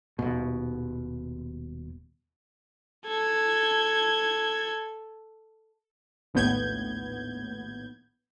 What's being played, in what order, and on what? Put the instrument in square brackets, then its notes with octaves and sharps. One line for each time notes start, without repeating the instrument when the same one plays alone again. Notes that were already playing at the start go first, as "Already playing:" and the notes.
[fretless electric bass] D#1 B2
[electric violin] A4 G#6
[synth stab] A#1 D#2 A2 B3 G6 G#6